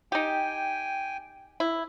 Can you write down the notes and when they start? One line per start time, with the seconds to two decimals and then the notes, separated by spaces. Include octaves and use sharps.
0.12 D#4 G4 G5 G#5
1.60 E4